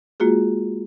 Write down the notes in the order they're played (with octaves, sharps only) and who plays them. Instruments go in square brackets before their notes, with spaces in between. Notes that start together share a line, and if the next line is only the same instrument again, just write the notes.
[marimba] G#3 A#3 F4 F#4 G#4